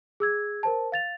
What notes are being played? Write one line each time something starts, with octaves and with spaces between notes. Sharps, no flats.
G#4 E6 G#6
A#4 C5 A5
F5 A6 F7